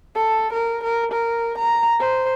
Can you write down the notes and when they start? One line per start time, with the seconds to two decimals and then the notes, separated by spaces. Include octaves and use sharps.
0.15 A4
0.53 A#4
0.84 A#4
1.12 A#4
1.58 A#5
2.00 C5